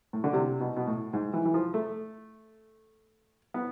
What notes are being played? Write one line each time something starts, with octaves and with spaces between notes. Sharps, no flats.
A2
D3
C3
B2
B2
A2
G#2
E3
E3
F3
A3
B3